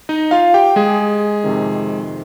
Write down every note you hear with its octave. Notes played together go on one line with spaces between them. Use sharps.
D#4 D#5
F4 F5
G4 G5
G#3 G#4
F2 C3 D#3